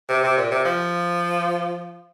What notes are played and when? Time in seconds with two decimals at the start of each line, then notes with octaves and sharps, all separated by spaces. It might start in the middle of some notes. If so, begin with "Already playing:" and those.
0.09 C3
0.23 C3
0.37 A#2
0.51 C3
0.65 F3